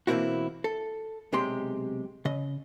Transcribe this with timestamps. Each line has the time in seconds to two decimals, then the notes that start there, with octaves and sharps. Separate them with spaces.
0.07 B2 E3 A#3 C4 E4 F#4
0.64 A4
1.33 B1 C3 G#3 G4 C6
2.25 C#3 D#5